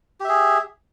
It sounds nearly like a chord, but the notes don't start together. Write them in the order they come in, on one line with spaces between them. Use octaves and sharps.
G4 E5 G#4